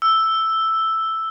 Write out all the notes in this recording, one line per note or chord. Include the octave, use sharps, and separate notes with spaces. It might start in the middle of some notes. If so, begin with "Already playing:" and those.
E6